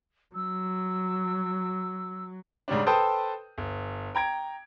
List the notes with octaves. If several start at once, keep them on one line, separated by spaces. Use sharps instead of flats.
F#3 E6
G#2 C#3 G3 C#4 D4
A4 B4 C5 G5 A5 D#6
G1
G5 A#5 G#6 D7